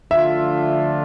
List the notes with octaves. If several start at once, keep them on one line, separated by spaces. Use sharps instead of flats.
D3 F3 A3 D4 F4 E5